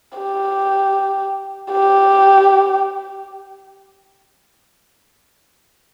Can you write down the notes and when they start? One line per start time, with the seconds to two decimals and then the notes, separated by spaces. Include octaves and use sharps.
0.18 G4
1.71 G4